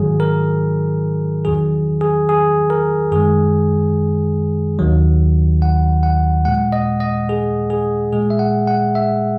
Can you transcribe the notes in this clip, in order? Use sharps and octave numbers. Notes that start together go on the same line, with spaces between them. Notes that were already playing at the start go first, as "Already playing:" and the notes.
Already playing: G#2 D#3 F#3 G#4
A#4
E2 D#3 F#3 G#4
G#4
G#4
A#4
F#2 D#3 G#3 G#4
D#2 D#3 F#3
F#5
F#5
A#2 G#3 F#5
D#5
D#5
G#4
G#4
A#2 G#3 G#4
E5
F#5
F#5
E5